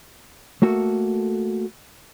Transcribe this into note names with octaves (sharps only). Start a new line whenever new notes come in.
A3 A#3 F#4 A4